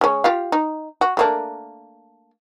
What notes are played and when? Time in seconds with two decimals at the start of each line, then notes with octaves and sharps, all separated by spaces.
0.01 G#3 C#4
0.24 F4 G4 F5
0.52 D#4
1.01 F#4
1.17 A3 A#3 D4